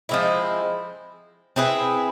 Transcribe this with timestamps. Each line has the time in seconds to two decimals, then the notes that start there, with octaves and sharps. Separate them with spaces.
0.09 F3 G#3 C4 E4
1.56 C4 E4 G#4 B4